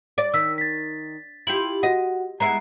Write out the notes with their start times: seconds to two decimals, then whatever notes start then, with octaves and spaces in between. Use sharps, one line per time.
0.18 D5
0.34 D#3 E6 B6
0.58 A6 B6
1.47 E4 F4 G4 F#7
1.83 F#4 D#5 F#5
2.40 G#3 B3 E4 A#5 C7